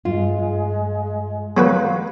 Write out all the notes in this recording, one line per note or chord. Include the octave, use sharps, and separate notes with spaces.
G2 G#3 F4
F#3 B3 F#4 B4 F5